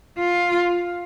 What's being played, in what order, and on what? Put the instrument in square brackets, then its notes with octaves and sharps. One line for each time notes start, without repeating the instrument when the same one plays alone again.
[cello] F4